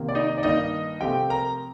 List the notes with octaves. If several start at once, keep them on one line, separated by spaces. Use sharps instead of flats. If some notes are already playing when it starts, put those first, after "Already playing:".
Already playing: C3 D#3 A#3
D5
D#4 D#5
D5
G2 D#3 A#3 D#4 D#5
C3 F3 A3 C4 G4 G5
A#4 A#5